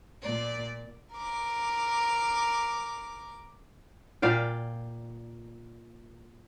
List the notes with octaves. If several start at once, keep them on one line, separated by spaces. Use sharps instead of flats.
A#2 D5
A#4 D6
A#2 D5 F5 G5